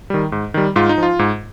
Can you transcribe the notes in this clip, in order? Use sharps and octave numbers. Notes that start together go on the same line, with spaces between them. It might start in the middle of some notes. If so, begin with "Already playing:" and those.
D#3 G3
G#2
D#3 G3
G#2 F4
D#4
F3 F4
G#2